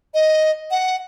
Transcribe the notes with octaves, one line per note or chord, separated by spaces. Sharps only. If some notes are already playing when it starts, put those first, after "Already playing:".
D#5
F#5